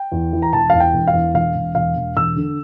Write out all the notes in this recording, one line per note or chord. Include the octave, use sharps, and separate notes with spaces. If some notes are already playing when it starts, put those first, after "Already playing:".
Already playing: G5
E2
E3
A#5
E1 A5
E2 F5
G5
E1
F5
E2
E1 F5
E1
E1 F5
E1
E1 E6
D3